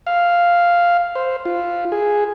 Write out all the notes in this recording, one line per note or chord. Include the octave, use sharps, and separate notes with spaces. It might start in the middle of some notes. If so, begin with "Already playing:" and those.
F5
C5
F4
G#4